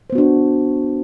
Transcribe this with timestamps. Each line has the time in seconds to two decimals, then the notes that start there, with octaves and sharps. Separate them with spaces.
0.10 C5
0.12 B3
0.15 F#4
0.18 D4